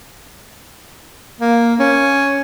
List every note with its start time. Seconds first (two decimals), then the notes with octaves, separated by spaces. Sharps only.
1.41 A#3
1.79 C#4